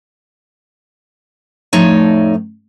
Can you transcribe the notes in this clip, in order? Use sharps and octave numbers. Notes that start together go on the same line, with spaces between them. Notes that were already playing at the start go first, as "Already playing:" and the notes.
F2 A2 A3 D#4 C#5 D5